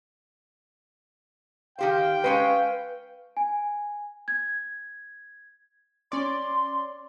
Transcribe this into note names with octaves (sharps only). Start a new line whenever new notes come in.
D#3 G4 C5 F5 G5
G#3 C#4 B4 F5 G#5
G#5
G#6
C#4 D5 C6